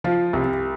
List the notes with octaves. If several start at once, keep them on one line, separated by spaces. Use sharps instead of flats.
F3 F4
C2